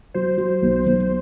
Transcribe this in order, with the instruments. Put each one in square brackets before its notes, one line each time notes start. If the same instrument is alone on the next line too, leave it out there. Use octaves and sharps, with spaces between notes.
[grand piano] F#3 [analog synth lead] C5
[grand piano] F#3
B1
B1